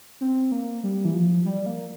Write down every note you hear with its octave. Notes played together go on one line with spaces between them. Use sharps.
C4
A#3
G3
E3
F3
G3
A#3